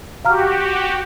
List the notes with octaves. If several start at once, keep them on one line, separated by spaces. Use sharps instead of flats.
F#4 G4 F5 A#5 F6